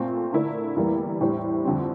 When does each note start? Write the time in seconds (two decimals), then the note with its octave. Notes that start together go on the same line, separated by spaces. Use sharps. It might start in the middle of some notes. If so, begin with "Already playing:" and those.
Already playing: A#2 A3 C4
0.33 D3 A3 E4 A#4 D5
0.76 E2 E3 G3 A#3 E4
1.21 A2 G3 D4 G4 C5
1.65 F2 D3 G3 C4